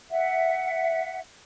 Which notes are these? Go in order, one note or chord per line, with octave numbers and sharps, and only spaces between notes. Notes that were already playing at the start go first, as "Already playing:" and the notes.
E5 F#5